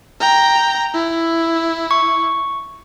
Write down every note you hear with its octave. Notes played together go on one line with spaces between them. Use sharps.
G5 A#5
E4
C#6